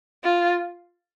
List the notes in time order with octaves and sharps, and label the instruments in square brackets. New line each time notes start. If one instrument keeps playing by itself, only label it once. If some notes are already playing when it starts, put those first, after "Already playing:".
[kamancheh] F4